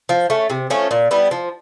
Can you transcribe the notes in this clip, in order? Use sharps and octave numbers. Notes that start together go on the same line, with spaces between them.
F3
A3 C#4
C3
F3 A3 C#4
A#2
G3 B3 E4
F3